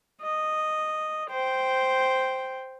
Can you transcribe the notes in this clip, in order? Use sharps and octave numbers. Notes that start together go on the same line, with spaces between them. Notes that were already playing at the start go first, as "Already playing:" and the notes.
D#5
C5 G5